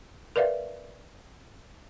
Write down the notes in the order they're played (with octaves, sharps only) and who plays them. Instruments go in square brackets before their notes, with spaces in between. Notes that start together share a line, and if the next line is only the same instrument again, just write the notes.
[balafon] A#4 B4 D5 E5 F5